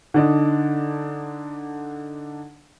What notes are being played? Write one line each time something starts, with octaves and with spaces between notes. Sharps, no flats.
D3 D4 D#4